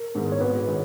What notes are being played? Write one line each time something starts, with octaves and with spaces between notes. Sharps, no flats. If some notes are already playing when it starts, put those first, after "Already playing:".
Already playing: A#4
G#2 D#3 G#3 B3
C#5
G#1 B4
D#3 G#3 C#4